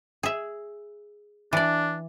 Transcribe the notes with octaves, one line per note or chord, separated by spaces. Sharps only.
G#4 E5
E3 D4 D5